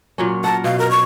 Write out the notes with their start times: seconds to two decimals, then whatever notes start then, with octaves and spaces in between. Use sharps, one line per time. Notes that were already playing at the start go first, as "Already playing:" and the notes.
0.18 A#2 F#3 C#4
0.44 A#4 F#5 A5
0.64 B2 F5
0.79 A#4
0.91 C#6